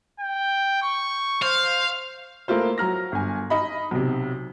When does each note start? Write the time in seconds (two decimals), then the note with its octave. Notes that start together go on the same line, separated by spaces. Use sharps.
0.20 G5
0.82 C#6
1.42 C5 F5
2.48 A3 A#3 E4 F4 C5
2.78 F#3 A#5 F6 A#6
3.12 G1 G#5
3.50 D#4 D#5 B5
3.91 B1 C3